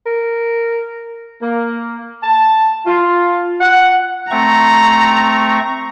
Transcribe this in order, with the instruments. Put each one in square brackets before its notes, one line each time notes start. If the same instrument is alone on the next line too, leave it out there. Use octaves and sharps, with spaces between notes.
[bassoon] A#4
[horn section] A#3
A5
F4
F#5
[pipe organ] A3 C4 C#6 [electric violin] A#5